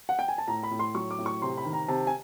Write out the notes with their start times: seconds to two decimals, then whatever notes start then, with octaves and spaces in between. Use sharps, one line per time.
0.09 F#5
0.19 G5
0.28 G#5
0.38 A5
0.48 A2 A#5
0.63 B5
0.71 A2
0.79 C6
0.95 F#3 C#6
1.11 D6
1.19 A2
1.26 C#6
1.42 C3 C6
1.58 B5
1.65 D#3
1.73 A#5
1.88 C3 A5
2.07 G#5